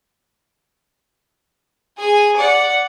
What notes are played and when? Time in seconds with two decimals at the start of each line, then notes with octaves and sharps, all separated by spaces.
1.97 G#4 G#5
2.36 D5 F#5